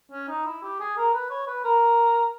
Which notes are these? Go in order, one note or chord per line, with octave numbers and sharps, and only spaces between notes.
C#4
D#4
E4
G4
G#4
A#4
B4
C#5
B4
A#4